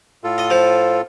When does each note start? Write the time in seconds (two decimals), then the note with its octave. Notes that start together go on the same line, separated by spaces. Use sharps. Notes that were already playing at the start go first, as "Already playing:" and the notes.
0.24 A2 F4 A4
0.38 D#5
0.50 F3